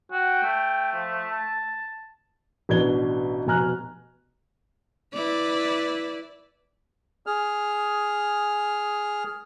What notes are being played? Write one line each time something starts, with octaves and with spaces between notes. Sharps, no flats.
F#4 G5
A3
F3
A5
A1 B2 D4 G#6 G7
F1 B2 G#5 A#5 F6 F#6
E4 B4 D5
G#4 F6